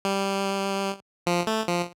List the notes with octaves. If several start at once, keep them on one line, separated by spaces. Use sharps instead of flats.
G3
F3
A3
F3